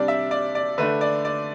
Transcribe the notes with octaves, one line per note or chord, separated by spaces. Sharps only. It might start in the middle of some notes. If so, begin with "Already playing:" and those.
Already playing: C3 G3 D4 D5
E5
D5
D5
D3 A3 D4 B4
D5
D5